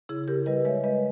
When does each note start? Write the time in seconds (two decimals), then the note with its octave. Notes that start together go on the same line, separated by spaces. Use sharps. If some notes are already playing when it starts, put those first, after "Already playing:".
0.09 C#3 E4 G#4
0.28 C#3 G4 A#4
0.46 G3 B4 D#5
0.65 G#3 C#5 E5
0.84 G#3 B4 D#5